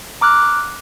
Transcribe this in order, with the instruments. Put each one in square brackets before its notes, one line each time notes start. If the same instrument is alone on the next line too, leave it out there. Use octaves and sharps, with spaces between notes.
[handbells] A#5 D6 F6 F#6